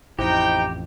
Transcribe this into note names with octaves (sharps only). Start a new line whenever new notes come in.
A1 F2 D#4 E4 G4 C5 G5 G6